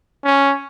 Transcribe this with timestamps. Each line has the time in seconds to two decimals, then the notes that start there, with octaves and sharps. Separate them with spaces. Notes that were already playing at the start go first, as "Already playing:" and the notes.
0.25 C#4